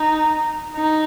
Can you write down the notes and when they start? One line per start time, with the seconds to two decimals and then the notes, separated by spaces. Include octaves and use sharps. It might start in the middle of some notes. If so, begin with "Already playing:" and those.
Already playing: D#4
0.76 D#4